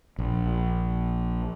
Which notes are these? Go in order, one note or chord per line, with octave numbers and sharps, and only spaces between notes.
A#1